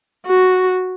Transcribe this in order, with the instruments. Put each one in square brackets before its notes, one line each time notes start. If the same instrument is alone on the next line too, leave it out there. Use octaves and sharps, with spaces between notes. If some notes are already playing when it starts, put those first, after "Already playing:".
[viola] F#4